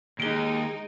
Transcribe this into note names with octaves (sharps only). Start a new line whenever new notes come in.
D#2 G#3 D#4 D7 G7